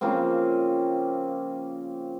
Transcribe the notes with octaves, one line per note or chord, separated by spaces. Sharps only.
C#3 F3 A#3 C4